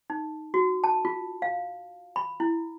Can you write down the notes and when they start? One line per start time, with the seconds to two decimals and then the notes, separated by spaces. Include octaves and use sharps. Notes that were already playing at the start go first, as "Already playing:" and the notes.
0.10 D#4
0.54 F#4
0.84 A5
1.05 F4
1.42 F5
2.16 B5
2.40 E4